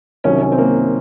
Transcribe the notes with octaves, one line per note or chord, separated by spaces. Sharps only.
C2 C3 D#3 F#3 C#4
C#4
C4
A#3